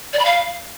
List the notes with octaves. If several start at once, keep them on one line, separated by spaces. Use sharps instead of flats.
D5
B5
F5